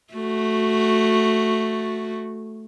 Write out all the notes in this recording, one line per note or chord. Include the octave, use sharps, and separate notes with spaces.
A3 F#4